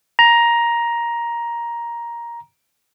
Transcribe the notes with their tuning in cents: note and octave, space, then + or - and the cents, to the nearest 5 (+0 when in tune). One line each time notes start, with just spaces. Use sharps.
A#5 +10